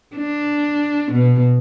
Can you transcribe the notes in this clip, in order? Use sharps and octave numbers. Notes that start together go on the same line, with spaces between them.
D4
B2